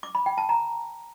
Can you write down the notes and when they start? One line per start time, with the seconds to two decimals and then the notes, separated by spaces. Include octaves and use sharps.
0.03 D6
0.15 B5
0.26 G5
0.38 A5
0.49 A#5